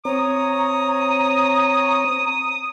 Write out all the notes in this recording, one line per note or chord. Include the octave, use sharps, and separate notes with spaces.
C4 C#5 A#5 D#6